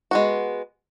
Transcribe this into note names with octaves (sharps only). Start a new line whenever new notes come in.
G#3 B3 F#4